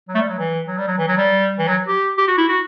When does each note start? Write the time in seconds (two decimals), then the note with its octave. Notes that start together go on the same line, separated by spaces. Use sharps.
0.09 F#3
0.15 A3
0.18 G3
0.29 F#3
0.39 E3
0.68 F#3
0.78 G3
0.88 F#3
0.99 E3
1.08 F#3
1.18 G3
1.59 E3
1.68 F#3
1.88 G4
2.18 G4
2.28 F#4
2.38 E4
2.49 F#4